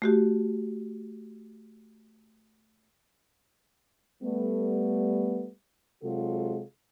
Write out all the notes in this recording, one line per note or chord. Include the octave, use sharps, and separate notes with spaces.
A3 F#4 G4
G3 A3 B3
C3 F#3 G#3 F4 F#4 A4